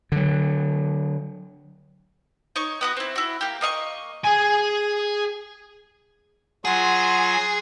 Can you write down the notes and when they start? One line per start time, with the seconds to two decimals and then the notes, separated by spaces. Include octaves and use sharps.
0.12 D3 F#3
2.56 D#4 C#5 C#6
2.81 B3 F#4 D#6
2.97 C4 E4
3.16 E4 F#4
3.41 A#3 G4
3.61 A#3 D#5 F5 C#6
4.25 G#4 G#5
6.65 F#3 F4 G#4 F#5 C6